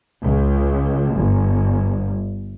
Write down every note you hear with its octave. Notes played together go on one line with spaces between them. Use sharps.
C#2
G1